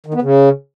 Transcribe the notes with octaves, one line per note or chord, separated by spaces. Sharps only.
D#3
B3
C#3